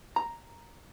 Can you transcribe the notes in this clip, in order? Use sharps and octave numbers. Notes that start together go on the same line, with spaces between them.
A#5